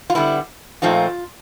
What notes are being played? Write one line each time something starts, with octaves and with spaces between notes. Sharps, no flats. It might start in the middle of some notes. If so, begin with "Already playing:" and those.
F4
D3 G3 B3 E4
A#2 F3 A3 C4 D#4 F4